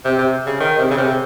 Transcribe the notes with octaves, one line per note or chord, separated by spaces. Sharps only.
C3
C3
C#3
D#3
C3
C#3
C3